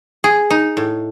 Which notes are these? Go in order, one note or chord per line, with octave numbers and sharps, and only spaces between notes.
G#4
D#4
A2